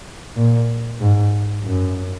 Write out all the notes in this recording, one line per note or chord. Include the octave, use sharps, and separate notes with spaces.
A#2
G#2
F#2